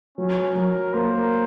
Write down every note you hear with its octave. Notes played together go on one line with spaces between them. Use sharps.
F#3 C#4
F#3 A#4
A#3 C5